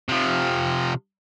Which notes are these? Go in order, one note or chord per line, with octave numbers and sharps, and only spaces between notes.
C3 F3